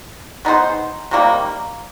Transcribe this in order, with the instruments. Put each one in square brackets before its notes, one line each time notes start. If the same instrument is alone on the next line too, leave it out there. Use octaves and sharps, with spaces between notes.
[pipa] B3 D#4 G#4 C5
C3 D#3 G3 A#3